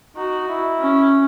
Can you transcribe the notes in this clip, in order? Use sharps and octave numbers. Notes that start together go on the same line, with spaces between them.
D#4 F#4
E4
C#4